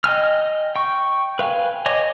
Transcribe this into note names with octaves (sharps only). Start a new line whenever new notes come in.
D#5 G5 G#5 F6
G5 C#6
B4 F5 G5 G#5
C#5 D#5 G#5 D6